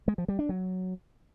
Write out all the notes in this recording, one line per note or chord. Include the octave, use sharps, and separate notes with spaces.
G#3
F3
G3
D4
F#3